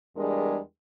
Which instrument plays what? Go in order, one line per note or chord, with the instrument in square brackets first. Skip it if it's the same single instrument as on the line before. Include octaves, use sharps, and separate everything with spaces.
[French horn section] E2 G3 G#3 D4 G#4 A#4